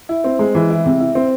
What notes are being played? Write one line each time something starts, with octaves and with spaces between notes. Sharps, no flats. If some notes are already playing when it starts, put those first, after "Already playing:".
E4
C4
G#3
E3
E4
C3
E4
C4